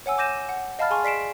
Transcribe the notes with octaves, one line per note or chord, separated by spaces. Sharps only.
C#5 F#5 G#5 E6
D6 G6 A#6 D#7 E7
F#5
D#5 F5 A5 B5 F6 A6
G#4 G#5 C6 C#6 F6
D5 B6 C7 D7 E7